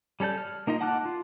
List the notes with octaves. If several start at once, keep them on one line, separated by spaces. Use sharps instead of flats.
G3 C#4 A4 D5 G6
F6
A#3 D#4 F4 D#5
F#5 A5 D6 F6 F#6
F4